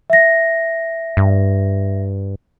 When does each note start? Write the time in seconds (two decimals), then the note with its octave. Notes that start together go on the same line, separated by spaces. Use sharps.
0.10 E5 A#6
1.17 G2